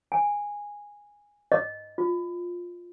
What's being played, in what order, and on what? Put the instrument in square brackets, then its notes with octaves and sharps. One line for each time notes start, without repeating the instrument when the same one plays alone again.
[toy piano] G#5
D#5
F4